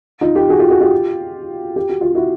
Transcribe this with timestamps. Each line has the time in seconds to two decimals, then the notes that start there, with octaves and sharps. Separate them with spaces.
0.21 D#4 F4
0.35 F4 G4
0.49 F#4 G#4
0.59 F4 G4
0.70 F#4 G#4
0.81 F4 G4
1.76 G4
1.89 F#4
2.01 F4
2.15 E4 F#4